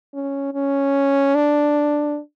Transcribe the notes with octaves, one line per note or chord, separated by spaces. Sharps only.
C#4
C#4
D4